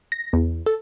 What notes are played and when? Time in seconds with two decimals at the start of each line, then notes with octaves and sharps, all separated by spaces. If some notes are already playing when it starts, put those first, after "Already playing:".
0.12 A#6
0.33 E2
0.66 A4